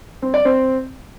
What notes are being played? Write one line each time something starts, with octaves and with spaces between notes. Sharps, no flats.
C4
D5
C4